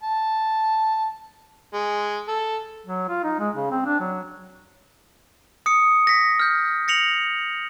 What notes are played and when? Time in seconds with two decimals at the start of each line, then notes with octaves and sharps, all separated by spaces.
0.03 A5
1.74 G#3
2.28 A4
2.86 F#3
3.09 F4
3.24 D#4
3.39 G#3
3.56 C#3
3.71 C4
3.85 D4
4.00 F#3
5.66 D#6 C#7
6.07 A#6 B6
6.40 F6 G6
6.88 A#6 C#7 F7 F#7